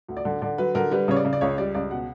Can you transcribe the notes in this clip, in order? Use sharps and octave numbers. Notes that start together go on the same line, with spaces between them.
D2
D5
D3
D3 D5
F#3 B4
D3 A#4
G3 B4
C#3 C#5
D5
C#3
D5
C#2 C#5
G3 D5
C#2 D5
B2 F#5